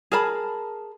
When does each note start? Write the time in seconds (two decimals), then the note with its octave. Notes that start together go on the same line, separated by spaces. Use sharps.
0.12 G#4 A#4 A5 B5